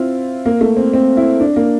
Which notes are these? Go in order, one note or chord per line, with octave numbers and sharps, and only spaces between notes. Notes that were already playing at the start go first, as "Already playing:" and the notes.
Already playing: C4 E4 F4
A#3
A3
C4
C4
E4
D4
A#3